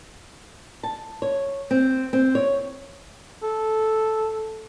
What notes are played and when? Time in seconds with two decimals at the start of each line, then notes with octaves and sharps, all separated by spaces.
0.83 A5
1.22 C#5
1.71 C4
2.13 C4
2.35 C#5
3.43 A4